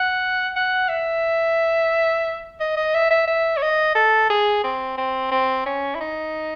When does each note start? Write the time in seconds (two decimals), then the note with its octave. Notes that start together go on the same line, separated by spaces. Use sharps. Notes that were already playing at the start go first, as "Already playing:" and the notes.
Already playing: F#5
0.56 F#5
0.89 E5
2.60 D#5
2.76 D#5
2.94 E5
3.10 E5
3.27 E5
3.57 C#5
3.62 D#5
3.95 A4
4.30 G#4
4.64 C4
4.98 C4
5.31 C4
5.66 C#4
5.95 E4
6.00 D#4